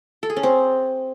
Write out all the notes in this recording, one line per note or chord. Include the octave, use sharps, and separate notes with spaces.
A4
G#4
C#4
C4